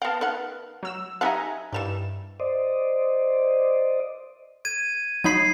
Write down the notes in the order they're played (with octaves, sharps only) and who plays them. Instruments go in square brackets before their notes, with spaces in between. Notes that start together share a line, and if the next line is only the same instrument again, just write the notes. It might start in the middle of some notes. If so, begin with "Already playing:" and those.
[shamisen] B3 G5 [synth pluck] F5 A5
[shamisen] D#3 B3 F#5 [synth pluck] F6
[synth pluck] F#3 E6 E7
[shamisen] D#4 G4 F#5 [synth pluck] E5 G#5 A#5
[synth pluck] G2 E7 [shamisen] E3 G3 D#4
[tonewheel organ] C5 D5 D#5
[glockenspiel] G#6 D#7
[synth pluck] F#3 D#4 B5 [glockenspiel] G#6 C7